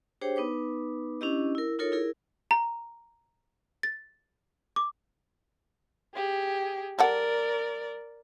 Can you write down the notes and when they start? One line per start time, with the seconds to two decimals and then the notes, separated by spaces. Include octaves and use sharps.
0.21 D4 G4 G#4 C5 C#5 G5
0.36 B3 D#4 B4 D6
1.21 C#4 D4 E4 G4 D#5
1.55 E4 A#4
1.79 D#4 F4 A4 A#4 C#5
1.92 E4 G#4 A#4
2.51 A#5
3.83 A6
4.76 D6
6.15 G4 G#4
6.99 G3 A4 A#4 D5 F#5